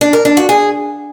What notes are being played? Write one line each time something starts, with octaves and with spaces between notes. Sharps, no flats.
D4
A#4
D4
F#4
G#4